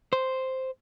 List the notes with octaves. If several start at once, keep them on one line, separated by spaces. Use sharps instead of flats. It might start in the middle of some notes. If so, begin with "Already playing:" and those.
C5